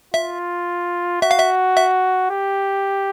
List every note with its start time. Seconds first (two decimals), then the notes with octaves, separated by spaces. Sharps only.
0.14 F4 E5
1.22 F#4 E5
1.31 F5
1.39 E5
1.77 E5
2.30 G4